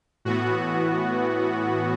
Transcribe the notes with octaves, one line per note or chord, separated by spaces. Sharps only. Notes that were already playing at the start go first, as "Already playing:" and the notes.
A2 E3 B3 F#4